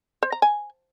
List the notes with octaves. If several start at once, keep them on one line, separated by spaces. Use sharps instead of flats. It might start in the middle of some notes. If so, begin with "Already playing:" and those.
C5
A#5
G#5